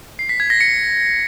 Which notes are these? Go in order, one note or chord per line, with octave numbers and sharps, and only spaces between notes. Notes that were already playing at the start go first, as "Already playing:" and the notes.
C7
B6
G#6
A#6
C#7